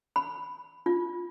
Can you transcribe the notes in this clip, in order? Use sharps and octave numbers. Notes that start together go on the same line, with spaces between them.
B5
F4